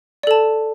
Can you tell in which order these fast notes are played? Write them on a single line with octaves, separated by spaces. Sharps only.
D5 A4 A5